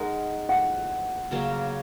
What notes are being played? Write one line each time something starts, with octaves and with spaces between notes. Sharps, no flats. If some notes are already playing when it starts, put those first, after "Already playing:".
Already playing: G#3 D#4 A#4 F#5
F#5
C#3 F#3 A#3 C#4